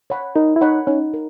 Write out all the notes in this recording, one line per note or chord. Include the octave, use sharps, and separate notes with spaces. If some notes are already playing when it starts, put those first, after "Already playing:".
C#5 F#5 B5
D#4 A#4
E4
D#4 C#5 F#5 B5
C#4 D#4
A#4